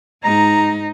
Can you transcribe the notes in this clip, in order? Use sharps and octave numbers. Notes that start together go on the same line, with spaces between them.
G#2 D#4 A#5